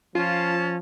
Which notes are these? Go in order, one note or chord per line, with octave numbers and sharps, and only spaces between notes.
F3 C#4 F4 A5